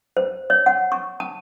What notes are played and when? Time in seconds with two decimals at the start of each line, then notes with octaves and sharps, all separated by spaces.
0.17 C5
0.50 C#5
0.66 F#5
0.92 C#6
1.20 A5